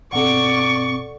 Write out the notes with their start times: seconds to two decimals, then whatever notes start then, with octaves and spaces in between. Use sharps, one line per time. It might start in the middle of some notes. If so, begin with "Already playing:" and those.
0.13 G2 B2 C4 A4 D5 F#5 C#6 D6